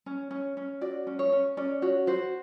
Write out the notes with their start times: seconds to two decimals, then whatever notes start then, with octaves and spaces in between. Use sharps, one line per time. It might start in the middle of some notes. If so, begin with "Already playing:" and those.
0.06 C#4
0.31 C#4
0.57 C#4
0.81 F#4 D5
1.07 C#4
1.19 C#5
1.32 C#4
1.57 C#4 D5
1.82 F#4 C#5
2.07 F#4 C5